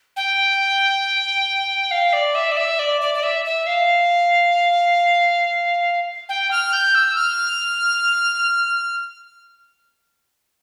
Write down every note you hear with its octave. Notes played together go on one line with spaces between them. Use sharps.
G5
F5
D5
E5
D5
E5
D5
D5
D5
E5
E5
F5
G5
F6
G6
E6
F6